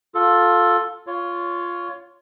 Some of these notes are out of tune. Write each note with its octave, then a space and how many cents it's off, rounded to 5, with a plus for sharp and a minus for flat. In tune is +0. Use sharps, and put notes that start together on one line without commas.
F4 +15 A4 +0
F4 +0 C#5 +15